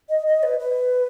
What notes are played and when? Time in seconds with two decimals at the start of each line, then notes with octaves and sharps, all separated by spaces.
0.09 D#5
0.26 D#5
0.43 B4
0.59 B4